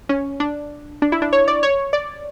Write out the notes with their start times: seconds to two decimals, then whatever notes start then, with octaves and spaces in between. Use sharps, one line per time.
0.09 C#4
0.40 D4
1.02 D4
1.12 E4
1.22 D4
1.33 C#5
1.48 D5
1.63 C#5
1.93 D5